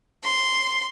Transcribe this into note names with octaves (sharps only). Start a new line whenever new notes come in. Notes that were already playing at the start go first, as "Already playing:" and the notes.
C6